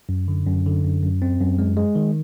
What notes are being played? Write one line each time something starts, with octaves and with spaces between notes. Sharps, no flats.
F#2
D3
F#2
D3
F#2
F#2
C4
F#2
G#3
G#3
D#3